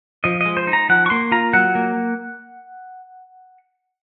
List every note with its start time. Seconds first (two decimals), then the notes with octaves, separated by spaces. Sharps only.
0.24 F3 D#5
0.41 G#3 D#5
0.57 C5
0.67 D#4
0.73 A#5
0.89 F3 F#5
1.06 C#6
1.10 A#3 C6
1.32 F4 A#5
1.53 F#3 F#5
1.75 A#3